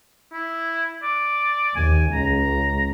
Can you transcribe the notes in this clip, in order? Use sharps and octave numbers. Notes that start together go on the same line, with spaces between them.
E4
D5
D#2 G#5
C#2 A#5